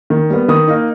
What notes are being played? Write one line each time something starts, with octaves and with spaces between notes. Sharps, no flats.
D#3
G3 B3
D#3 D#6
A#3 D#4